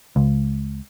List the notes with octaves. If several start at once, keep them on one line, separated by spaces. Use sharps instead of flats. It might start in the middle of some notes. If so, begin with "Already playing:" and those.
C#2